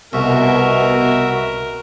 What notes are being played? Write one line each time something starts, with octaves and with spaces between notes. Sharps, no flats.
C2 B2 F#4 A#4 E5